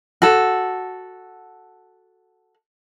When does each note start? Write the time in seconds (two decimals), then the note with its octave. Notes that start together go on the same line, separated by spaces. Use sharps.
0.22 F#4 A4